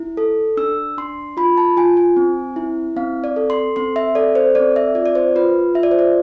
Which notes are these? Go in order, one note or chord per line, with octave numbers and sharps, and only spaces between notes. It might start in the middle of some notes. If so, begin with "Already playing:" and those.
Already playing: E4
A4
D4 E6
D4 C6
F4 B5
A5
F4 G#5
G#5
C4
E4
C4 F5
D5
A4
C6
C4 C6
E5
A4 D5
C5
C4 D5
E5
F4 D5
D5
C5
F4 B4
F4 E5
D5
C5
D5